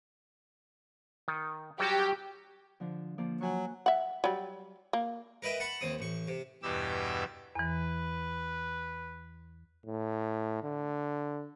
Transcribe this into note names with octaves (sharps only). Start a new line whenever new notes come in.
D#3
F#3 G3 F#4 G4
D3 F3 D4
F3 A#3 D5
F#3 F#5 G#5 C#6
E5 F#5
F#3 G3
A#3
A#4 B4 D#5 E5 G5
F#5 A5 B5 C#6
D#2 C4 D#6
A1 C#6
C3
E2 G2 B2 G4 D6 E6
E2 E3 B4
A2
D3